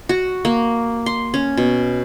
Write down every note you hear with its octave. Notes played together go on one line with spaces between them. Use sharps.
F#4
A#3
C6
C#4
B2